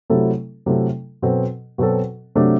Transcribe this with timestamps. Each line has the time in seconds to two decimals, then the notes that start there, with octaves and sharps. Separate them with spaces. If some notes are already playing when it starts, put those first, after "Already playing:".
0.10 C3 F#3 A3 E4 A4
0.66 C3 F#3 A3 E4 A4
1.22 B2 F#3 C4 F#4 A4
1.78 B2 F#3 C4 F#4 A4
2.35 C3 F#3 A3 D4